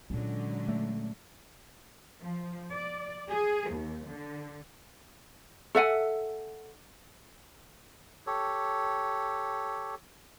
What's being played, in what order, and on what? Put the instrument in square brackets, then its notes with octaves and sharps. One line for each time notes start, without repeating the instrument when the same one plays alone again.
[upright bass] A#2 C#4 [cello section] D3 F#3 G#3
[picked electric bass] A3
[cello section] F3
D5
G#4
D#2
D3
[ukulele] A4 E5 F#5 G#5
[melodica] G4 A4 C#5